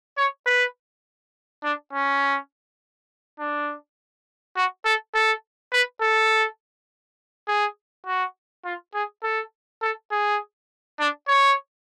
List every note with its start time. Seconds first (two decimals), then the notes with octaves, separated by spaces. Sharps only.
0.17 C#5
0.46 B4
1.64 D4
1.93 C#4
3.39 D4
4.56 F#4
4.85 A4
5.14 A4
5.73 B4
6.01 A4
7.48 G#4
8.06 F#4
8.65 F4
8.94 G#4
9.23 A4
9.82 A4
10.11 G#4
10.99 D4
11.28 C#5